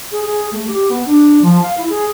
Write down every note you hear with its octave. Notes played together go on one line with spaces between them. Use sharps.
G#4
G#4
A3
G4
B3
D4
F3
F5
E4
G#4